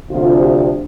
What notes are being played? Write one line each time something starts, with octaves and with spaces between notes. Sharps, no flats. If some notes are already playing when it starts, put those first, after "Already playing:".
D2 C3 F3 D4 F4
G4